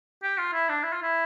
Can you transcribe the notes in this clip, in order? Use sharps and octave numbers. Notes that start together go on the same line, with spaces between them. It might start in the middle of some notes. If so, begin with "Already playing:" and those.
G4
F4
E4
D4
E4
F4
E4